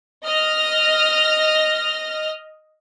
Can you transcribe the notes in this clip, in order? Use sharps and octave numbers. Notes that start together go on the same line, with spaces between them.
D#5 F6 A#6